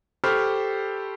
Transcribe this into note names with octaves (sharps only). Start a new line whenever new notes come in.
G4 A4 C5 B5 C#6 F6